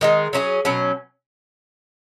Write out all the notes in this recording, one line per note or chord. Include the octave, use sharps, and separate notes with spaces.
D#3 G#3 D#4
F#3 C#4 E4 G#4
B2 F#3 C#4